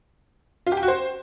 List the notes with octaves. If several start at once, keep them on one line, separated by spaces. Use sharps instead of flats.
F4
G4
G5
F#4
C5